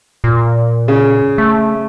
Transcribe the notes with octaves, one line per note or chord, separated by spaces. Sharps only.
A#2
C#3
A3